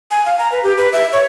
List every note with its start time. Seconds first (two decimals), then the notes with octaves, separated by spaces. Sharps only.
0.11 G#5
0.26 F5
0.39 A#5
0.52 B4
0.63 G4
0.78 B4
0.93 E5
1.12 C#5